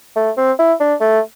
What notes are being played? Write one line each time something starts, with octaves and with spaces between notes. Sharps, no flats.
A3
C4
E4
D4
A3